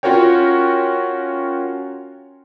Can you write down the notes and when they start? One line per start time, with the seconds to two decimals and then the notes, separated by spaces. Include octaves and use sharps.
0.03 C#4 F4 F#4 A#4 C#5 G5